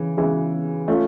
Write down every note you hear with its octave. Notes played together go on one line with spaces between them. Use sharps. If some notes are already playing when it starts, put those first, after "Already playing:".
Already playing: C#3 E3
C#3 E3 G#3
A3 C#4 F4